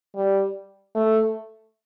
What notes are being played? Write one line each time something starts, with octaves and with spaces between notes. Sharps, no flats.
G3
A3